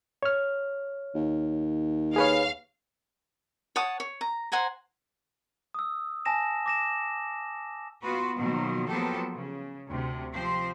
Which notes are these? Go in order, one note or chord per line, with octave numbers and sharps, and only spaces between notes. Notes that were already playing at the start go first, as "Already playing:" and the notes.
C#5 F6
D#2
G#4 B4 C#5 F5
C#5 F#5 A5 D#6
C#5
A#5
C5 F#5 G#5 A#5
D#6 E6
G#5 A5 A#6 E7
D6 A#6 E7
B3 F4 F#4 B4
B2 D#3 F3 F#3 A#3
F3 F#3 A#3 B3 G4 A4
C#3
D2 C3
F3 C4 G4 C5